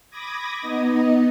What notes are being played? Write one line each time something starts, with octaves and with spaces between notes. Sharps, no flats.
B5 D6 D#6 G#6 A#6
B3 D#4 D#5